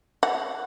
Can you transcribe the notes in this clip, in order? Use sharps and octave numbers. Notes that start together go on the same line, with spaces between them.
F#5